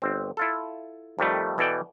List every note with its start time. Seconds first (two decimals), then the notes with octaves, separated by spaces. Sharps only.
0.02 G1 C4
0.37 E4 F4 A4
1.19 F2 D#3 G3 A3
1.58 B2 E3 A4 D5 G5